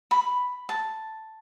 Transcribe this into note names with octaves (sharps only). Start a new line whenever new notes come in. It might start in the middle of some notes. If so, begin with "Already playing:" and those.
B5
A5